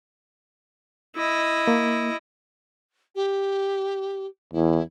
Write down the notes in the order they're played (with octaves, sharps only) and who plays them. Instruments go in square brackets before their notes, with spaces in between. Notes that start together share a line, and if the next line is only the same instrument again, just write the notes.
[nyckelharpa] E4 D#5
[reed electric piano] A#3
[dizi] G4
[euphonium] E2 [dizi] E4